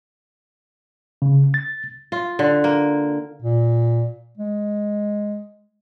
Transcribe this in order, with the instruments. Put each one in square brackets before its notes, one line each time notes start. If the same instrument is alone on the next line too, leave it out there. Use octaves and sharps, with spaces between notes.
[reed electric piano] C#3
A6
[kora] F4
D3
A#3
[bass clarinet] A#2
G#3